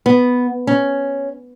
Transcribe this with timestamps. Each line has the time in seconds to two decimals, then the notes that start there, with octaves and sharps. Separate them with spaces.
0.06 B3
0.67 C#4